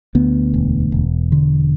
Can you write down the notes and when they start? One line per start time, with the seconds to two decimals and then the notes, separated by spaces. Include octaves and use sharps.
0.15 D2 B3
0.54 E1
0.92 E1
1.32 D3